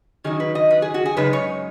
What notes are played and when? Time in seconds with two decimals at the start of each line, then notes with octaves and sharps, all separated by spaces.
0.24 D#3 F#3 D#4 G#4
0.40 B4
0.55 D#5
0.71 B4
0.82 G#4
0.94 F#4
1.06 G#4
1.17 F#2 C#3 G#3 D#4 B4
1.33 C#5